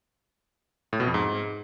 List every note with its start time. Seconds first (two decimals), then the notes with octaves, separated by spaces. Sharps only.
0.93 A2
1.00 B2
1.07 F2
1.14 G#2